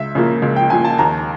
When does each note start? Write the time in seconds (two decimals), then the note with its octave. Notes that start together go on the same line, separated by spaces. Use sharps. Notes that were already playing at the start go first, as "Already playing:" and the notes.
Already playing: C#2 E5
0.15 C#3 F3 A#3
0.42 C#2
0.56 G5
0.70 C#3 F3 A#3 G#5
0.85 A5
0.98 D#2 A#5